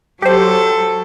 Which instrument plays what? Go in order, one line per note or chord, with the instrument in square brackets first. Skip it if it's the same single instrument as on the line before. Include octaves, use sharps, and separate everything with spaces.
[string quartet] F#3 A4 [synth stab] G4 C5